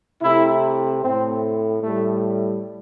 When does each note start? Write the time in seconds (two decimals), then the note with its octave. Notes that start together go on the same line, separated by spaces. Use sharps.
0.21 C3 A3 E4
1.01 A2 A3 C4
1.81 A2 G3 A3